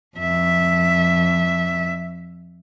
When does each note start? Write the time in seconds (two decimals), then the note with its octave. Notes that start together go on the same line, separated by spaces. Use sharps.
0.17 F2 E5